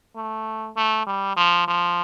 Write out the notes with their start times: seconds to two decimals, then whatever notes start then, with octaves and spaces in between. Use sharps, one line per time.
0.16 A3
0.77 A3
1.07 G3
1.37 F3
1.68 F3